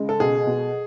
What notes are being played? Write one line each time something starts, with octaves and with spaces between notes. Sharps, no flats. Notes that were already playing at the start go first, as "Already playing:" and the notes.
Already playing: C#3 G#3
A4
B2 G#4
B2